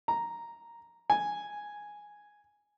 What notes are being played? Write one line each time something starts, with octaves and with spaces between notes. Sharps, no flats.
A#5
G#5